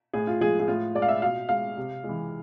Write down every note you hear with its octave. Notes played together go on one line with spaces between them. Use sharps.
A2 G#4
F4
F3 G#3 G#4
G#4
A2 F4
G#3 D5
F5
E5
B2 F5
G#3 F5
C3
E3 G#3